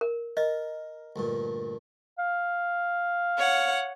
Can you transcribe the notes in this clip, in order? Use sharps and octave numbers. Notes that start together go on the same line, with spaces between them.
A#4
A#4 D#5
D2 G2 A#2
F5
C#5 F#5